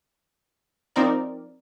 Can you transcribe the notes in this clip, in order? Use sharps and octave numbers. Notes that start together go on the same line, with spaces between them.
F3 C4 D#4 A#4 D5